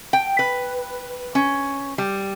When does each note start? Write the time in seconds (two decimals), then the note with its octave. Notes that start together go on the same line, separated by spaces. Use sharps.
0.13 G5
0.39 B4
1.35 C#4
1.98 G3